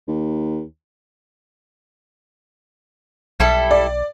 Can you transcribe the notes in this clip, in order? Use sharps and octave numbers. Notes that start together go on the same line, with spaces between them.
D#2
B1 G3 E4 A4
D5